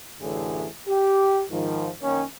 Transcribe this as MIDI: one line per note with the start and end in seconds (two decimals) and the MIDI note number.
0.21 0.67 33
0.21 0.67 42
0.21 0.67 50
0.21 0.67 52
0.21 0.67 57
0.21 0.67 68
0.88 1.43 67
1.51 1.90 44
1.51 1.90 51
1.51 1.90 53
2.02 2.24 42
2.02 2.24 51
2.02 2.24 58
2.02 2.24 61